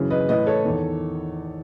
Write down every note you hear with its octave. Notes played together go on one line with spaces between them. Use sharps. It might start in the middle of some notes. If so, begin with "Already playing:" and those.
Already playing: F#2 C#3 E3
B4 D#5
A2 E3 B4 D#5
A4 C#5
E2 D#3